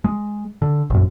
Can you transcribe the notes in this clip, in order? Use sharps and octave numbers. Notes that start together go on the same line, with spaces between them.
G#3
D3
A#1 F#2